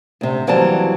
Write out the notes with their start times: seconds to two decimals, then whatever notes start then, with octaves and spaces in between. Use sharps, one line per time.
0.21 D2 C3
0.47 D#2 E3 F#3 G3 C4 A5